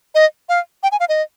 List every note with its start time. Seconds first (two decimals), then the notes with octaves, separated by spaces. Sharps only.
0.15 D#5
0.49 F5
0.83 G5
0.92 G#5
1.00 F5
1.09 D#5